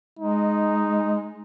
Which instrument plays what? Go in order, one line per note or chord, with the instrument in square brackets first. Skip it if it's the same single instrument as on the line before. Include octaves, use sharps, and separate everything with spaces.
[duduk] G#3 [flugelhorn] D#4